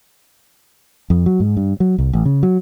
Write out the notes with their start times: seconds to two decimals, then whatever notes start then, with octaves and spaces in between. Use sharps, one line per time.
1.10 F2
1.26 F#3
1.40 G#2
1.57 G2
1.80 F#3
1.98 C2
2.13 A1
2.25 C#3
2.43 F#3